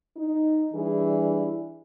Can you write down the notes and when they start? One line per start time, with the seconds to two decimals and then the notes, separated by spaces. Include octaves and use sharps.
0.17 D#4
0.73 E3 G3 D4 E4 G#4